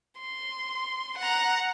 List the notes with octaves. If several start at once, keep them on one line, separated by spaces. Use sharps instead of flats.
C6
F#5 A#5